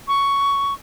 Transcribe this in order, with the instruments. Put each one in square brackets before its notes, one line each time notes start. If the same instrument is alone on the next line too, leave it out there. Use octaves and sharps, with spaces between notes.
[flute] C#6